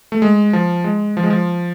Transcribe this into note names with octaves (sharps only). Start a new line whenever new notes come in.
A3
G#3
F3
G#3
F3
G#3
F3